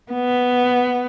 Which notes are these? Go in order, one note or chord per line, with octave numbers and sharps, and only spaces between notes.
B3